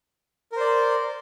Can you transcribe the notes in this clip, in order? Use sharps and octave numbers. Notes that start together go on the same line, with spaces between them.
A#4 C5 D5